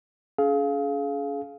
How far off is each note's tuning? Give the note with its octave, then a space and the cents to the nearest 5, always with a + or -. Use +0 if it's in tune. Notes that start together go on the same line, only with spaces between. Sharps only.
C#4 +45 G#4 +35 F5 +0